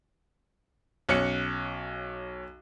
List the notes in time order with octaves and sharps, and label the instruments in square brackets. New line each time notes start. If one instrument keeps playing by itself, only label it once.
[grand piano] B1 C#4 F#6 C#7